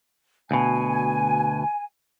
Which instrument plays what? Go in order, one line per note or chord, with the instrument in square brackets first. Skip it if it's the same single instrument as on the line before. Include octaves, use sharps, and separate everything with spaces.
[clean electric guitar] D2 B2 [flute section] G#5